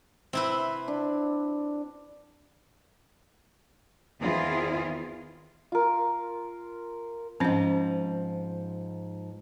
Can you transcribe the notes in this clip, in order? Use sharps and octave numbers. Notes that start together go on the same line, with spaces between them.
C3 C4 E4 B4
D4
E2 D#3 C4 E4 F4 G#4
F4 A#4
G#2 F3 C4 C#4